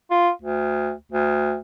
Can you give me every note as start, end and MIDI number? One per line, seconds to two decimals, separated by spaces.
0.11 0.30 65
0.42 0.92 38
1.12 1.57 38